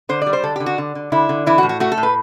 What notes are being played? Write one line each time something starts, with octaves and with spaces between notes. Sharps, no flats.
D3 C5
G3 D5
C5
D3 A4
D3 G4
F#4
D3
D3
D3 E4
D3
E3 E4
F#4
A2
F#4
A3 F#4
A4
A2
B4